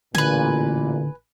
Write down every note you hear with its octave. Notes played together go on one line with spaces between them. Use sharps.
A1 A#2 D3 B4 G#5